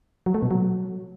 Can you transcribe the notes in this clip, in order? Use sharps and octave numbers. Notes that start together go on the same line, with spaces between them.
F#3
A3
B2
F#3